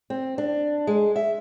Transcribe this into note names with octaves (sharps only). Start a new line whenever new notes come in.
C4
D4
G#3
E5